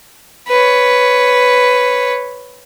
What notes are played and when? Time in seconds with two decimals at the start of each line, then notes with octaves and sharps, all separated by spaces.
0.48 B4 C#5